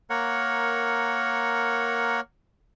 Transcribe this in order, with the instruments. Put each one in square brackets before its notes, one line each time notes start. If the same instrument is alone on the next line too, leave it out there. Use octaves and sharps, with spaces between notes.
[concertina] A#3 A#4 C#5 F#5